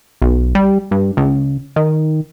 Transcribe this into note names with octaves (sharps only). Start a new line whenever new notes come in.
B1
G3
G2
C#2
D#3